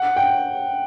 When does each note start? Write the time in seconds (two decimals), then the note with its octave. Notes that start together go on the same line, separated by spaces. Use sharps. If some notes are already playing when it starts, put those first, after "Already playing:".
Already playing: F#5
0.16 G5